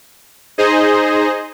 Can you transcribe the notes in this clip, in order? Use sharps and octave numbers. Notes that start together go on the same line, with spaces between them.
D#4 G#4 C5 D#5